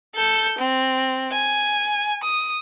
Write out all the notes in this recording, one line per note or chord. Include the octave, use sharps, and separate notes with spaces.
A4 G6
C4
G#5
D#6